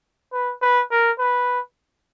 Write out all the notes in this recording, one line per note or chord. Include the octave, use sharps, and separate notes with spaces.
B4
B4
A#4
B4